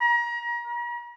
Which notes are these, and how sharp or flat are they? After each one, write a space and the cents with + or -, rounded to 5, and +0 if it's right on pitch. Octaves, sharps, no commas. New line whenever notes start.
A#5 +35
A#5 +45